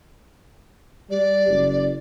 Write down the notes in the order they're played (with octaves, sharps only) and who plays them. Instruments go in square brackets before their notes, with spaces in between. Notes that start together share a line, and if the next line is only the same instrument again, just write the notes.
[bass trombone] G3 [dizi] D5
[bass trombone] F#1